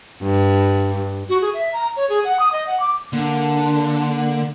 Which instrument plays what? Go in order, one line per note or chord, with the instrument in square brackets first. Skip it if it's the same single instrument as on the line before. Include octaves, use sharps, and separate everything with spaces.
[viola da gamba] G2
[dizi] F#4
G#4
E5
A#5
C#5
G#4
F#5
D#6
D#5
F#5
D6
[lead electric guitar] D3 [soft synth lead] A#3 [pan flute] D4